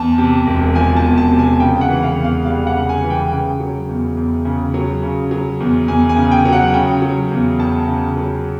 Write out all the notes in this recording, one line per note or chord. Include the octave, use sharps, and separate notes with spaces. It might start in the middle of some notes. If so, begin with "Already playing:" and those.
Already playing: E2 A5
C3
E1
F3 G#5
A5
E2
A5
C3
G#5
C#3 G5
F#5
E3
F5
E2
F5
G3 F5
F#5
C#3
G#5
E3
G5
C#3 G5
F#3
E2
E2
C#3
F#3
C#3
F#3
E2
E2 G#5
G#5
C#3
G5
F#3
F#5
C#3 G5
F#3
E2
E2 A5
C#3
F#3